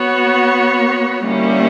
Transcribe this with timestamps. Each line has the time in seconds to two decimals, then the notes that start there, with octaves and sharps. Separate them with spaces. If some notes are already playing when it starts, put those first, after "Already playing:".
Already playing: B3 F#4 C#5
1.23 D3 G3 A#3 C#4 E4